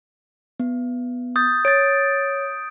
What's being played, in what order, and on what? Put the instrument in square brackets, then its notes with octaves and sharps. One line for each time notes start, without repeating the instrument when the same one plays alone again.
[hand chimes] B3
[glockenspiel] D#6 G6 A6
[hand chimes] C#5 G#6 A6 [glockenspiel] D7